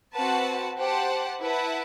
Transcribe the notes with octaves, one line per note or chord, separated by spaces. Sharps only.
C4 F#4 B4 F#5 A5
G4 C5 F#5 A5
E4 B4 F#5 A5